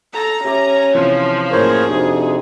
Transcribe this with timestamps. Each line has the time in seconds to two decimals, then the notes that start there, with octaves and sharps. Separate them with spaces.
0.14 A4 A#5
0.44 C#4 G4 E5 D6
0.94 C3 E3 F3 E4
1.52 F#2 A2 A#3 G#4 A#4 C5 C#5
1.87 F2 C3 D4 D#4 F#4